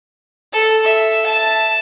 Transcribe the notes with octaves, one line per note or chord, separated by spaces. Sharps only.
A4
E5
A5